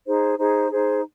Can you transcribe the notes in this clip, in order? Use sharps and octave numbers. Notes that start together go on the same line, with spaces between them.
D#4 G#4 C5
D#4 G#4 C5
D#4 G#4 C5